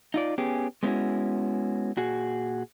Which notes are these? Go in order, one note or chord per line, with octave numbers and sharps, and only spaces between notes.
D#4 F4 D5
B3 C#4 G4 G#4
G#3 B3 C#4 D#4 E4 F#4
A#2 F#4 G#4